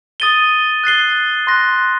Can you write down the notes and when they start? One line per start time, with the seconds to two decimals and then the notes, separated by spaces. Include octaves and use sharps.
0.20 D#6 A6 D#7 G7
0.84 F#6 A6 C7 G7
1.47 C6 F#6 A#6